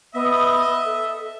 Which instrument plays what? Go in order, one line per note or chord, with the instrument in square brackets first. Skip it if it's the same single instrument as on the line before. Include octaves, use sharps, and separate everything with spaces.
[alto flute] B3 [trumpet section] D#5 [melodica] E5
[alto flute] A4